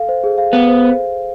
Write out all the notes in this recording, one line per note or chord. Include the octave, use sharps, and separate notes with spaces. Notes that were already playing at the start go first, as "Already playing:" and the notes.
Already playing: A4 F5
C5
G#4
F5
B3 F5
C5
C5